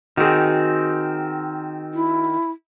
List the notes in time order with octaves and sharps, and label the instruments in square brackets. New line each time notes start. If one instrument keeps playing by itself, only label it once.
[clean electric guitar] D#3 C4 [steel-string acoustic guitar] F#4 G#4
[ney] E4